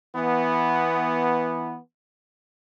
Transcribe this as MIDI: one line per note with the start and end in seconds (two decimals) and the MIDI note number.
0.16 1.78 52
0.16 1.78 59